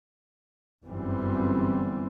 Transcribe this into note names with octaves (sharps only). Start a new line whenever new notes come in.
G1 F#2 E3 G3 C4